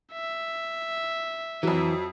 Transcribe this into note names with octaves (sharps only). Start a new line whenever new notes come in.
E5
F2 E3 F#3